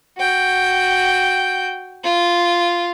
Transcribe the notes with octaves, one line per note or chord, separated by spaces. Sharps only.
F#4 G5
F4